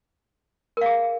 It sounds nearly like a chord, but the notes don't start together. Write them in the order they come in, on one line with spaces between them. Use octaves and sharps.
A#4 F5 G#4